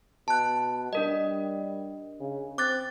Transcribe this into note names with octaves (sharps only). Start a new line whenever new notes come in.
B2 A5 F#6
G3 D4 A#4 D#5
C#3
C4 D6 F#6 A6